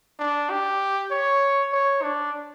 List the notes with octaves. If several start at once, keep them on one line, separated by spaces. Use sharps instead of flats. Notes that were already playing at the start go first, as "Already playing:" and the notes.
D4
G4
C#5
C#5
D4